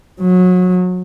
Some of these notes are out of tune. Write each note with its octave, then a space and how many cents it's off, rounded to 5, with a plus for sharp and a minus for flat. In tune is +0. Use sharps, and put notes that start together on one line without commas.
F#3 -25